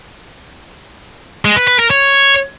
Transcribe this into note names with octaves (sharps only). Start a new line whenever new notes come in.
G#3
B4
B4
A#4
C#5